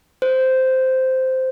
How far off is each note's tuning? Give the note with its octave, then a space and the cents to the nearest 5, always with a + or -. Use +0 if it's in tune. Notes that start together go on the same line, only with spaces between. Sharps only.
C5 -10